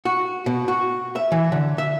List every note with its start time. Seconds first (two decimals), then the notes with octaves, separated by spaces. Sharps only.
0.05 F#4
0.46 B2
0.68 F#4
1.16 E5
1.32 E3
1.52 D3
1.78 E5